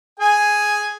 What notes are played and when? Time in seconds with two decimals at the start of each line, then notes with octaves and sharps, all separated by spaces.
0.20 G#4 G#5